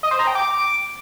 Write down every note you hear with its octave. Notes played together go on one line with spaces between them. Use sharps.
D#5
C5
A#5
G5
D6